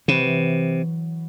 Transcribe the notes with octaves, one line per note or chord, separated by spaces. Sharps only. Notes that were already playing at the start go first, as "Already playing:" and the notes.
C3 E3 F#3